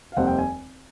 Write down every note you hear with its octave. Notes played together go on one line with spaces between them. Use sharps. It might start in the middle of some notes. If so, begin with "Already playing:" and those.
F5
F1 D#2 D#3 G3 C4 F#5
G5
G#5